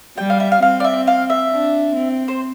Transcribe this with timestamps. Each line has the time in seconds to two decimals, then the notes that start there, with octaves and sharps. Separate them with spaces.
0.18 G3 G5
0.30 F5
0.40 E5
0.52 F5
0.62 C4 F5
0.80 D5
0.84 E5
1.07 F5
1.30 E5
1.51 D4
1.96 C4
2.28 C5